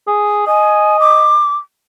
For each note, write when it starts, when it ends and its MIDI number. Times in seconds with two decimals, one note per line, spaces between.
0.07 0.43 68
0.47 1.35 75
0.47 0.97 80
1.00 1.55 86